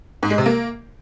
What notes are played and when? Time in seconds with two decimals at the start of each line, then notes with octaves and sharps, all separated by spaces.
0.23 G#2
0.30 G#3
0.38 C3
0.46 A#3